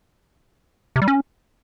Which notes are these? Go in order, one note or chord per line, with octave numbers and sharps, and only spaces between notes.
C3
G3
C#4